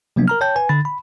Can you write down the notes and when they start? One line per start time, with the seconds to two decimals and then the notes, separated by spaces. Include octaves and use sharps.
0.16 C3 F3 F#3 A#3 B3 D4
0.28 A#4 A#5 F6
0.41 C#5 G5 A5 G6
0.56 B4 G#5
0.69 D3 B5 A6
0.85 B5